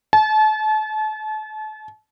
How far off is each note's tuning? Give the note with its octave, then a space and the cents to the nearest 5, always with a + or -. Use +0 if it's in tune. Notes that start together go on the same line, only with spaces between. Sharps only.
A5 -35